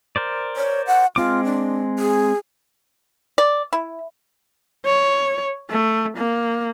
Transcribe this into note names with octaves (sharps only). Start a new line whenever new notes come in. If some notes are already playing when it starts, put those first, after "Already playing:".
A#4 C5 D5
C#5
F#5
G#3 C4 F4 D6
D4
G#4
D5
E4
C#5
A3
A#3